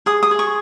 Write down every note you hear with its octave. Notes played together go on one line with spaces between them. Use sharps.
G#4 D#6
D#6
G#4
C#6